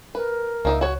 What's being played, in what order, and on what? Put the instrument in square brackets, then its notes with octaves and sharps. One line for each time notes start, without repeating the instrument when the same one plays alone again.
[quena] A#4 [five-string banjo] B4
[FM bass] C#2 [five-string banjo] A#3 D#4 E5
[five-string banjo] F#4 C#5